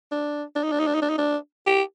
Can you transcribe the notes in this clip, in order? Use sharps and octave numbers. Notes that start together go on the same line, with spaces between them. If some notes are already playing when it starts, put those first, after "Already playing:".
D4
D4
D#4
D4
D#4
D4
D#4
D4
D#4
D4
G4